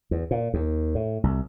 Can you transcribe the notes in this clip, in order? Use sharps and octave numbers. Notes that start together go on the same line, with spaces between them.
E2
A#2
D#2
A2
C2